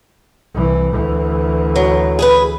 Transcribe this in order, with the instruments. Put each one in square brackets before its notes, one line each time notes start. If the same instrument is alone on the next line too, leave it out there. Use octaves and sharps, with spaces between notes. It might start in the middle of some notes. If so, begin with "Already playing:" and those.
[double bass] C2 E3
D2 E3
[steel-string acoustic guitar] F#3
G#4 A4 B4